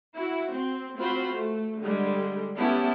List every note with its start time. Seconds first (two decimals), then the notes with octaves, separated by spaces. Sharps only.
0.15 E4 F#4
0.52 C4
0.98 C4 F4 F#4 C5 B5
1.34 A3
1.82 D3 G3 G#3
2.56 B3 C#4 E4 G4 A5